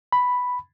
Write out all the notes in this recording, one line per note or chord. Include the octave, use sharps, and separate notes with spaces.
B5